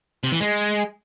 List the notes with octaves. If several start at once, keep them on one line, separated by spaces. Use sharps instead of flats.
C3
E3
G#3